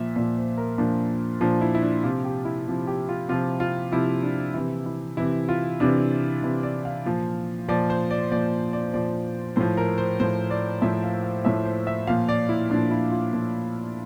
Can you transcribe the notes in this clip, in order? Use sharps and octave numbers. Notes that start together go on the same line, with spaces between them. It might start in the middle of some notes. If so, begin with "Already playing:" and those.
Already playing: A#2 F3 E5
A#2 F3 D5
C5
A#4
A#2 F3 D4
A#2 F3 D4
E4
E4
D4
C3 F3 F4
G4
E4
C3 F3
G4
F4
C3 F3 F4
F4
C3 F3 E4
D4
C3 E3 E4
E4
C3 E3 E4
F4
C3 E3 D4
C3 E3 E4
D5
F5
A#2 F3
A#2 F3 D5
C5
D5
A#2 F3 D5
D5
A#2 F3 D5
A2 F3 C5
A#4
C5
A2 F3 C5
D5
A2 F3 E5
F5
F5
A2 F3 E5
C5
E5
A#2 F3 F5
D5
E4
A#2 F3 D4
E4
F4
A#2 F3